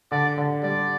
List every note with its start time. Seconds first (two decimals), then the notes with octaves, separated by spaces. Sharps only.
0.12 D3 D5
0.38 D3
0.63 G3 D5